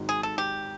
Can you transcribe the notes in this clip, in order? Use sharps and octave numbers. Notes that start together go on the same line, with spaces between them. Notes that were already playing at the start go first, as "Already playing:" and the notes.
Already playing: G#1 G#2 D#3 F#3
G#4
A4
G4